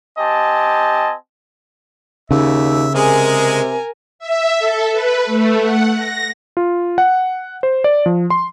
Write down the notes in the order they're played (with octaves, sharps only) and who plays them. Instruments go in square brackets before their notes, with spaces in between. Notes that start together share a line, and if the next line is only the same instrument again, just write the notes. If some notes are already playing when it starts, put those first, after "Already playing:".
[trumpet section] C4 G4 D#5 G#5 A5
[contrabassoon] D#2 [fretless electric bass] C#3 [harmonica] E5
[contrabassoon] C3 [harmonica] G#3 G#4 [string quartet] A#4 G#5
[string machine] E5
A4
B4
A3
F#5
A#6
[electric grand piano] F4
F#5
C5
D5
F3
C6